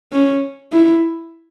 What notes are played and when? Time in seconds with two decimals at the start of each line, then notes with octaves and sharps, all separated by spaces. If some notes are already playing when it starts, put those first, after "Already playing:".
0.12 C#4
0.72 E4